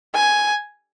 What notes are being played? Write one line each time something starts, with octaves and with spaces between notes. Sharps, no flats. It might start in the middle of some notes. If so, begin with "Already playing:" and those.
G#5